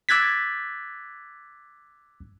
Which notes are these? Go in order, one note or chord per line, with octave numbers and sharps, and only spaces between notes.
D6 E6 F#6 G#6 A6 B6